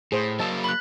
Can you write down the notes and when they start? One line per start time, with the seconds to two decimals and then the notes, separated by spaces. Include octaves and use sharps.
0.12 A2 G#4 C5
0.39 F#3 A#3 D#5 A5 E6 A6
0.64 B5 F#6